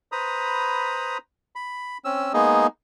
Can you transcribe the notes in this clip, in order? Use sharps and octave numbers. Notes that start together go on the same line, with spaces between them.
B4 C5 A#5 B5 D#6
B5
C4 C#4 E6
G#3 A#3 B3 D#4 G#4 D#5